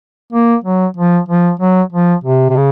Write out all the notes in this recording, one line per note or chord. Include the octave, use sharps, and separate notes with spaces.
A#3
F#3
F3
F3
F#3
F3
C3
C3
C#3